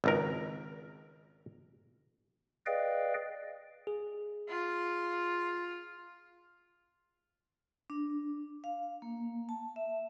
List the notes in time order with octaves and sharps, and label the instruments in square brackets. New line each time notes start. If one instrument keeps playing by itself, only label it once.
[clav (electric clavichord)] G#1 C#2 A#4
[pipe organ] G#4 B4 D5 D#5 F5 G5
[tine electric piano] G#4
[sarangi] F4
[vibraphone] D4
F5
A#3
A5
E5